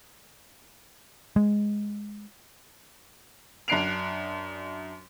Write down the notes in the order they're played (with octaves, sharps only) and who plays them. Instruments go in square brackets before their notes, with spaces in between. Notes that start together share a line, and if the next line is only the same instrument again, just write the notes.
[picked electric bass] G#3
[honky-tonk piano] F#2 D4 F#6 C7 D7 F7